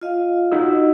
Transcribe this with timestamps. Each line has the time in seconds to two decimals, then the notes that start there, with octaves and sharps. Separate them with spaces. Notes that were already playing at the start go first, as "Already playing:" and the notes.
0.01 F4 D#5 F5
0.52 D#4 F#4 E6